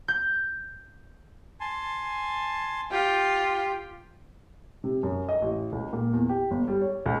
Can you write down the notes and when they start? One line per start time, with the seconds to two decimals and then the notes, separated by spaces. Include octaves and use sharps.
0.08 G6
1.60 G#5 A5 C6
2.91 F4 G4 G5
4.84 C3
5.03 F#2
5.29 D#5
5.42 A1
5.72 C#2
5.93 A#2
6.13 E2
6.29 G4
6.51 G1
6.68 G3
6.81 C#5
7.06 C#2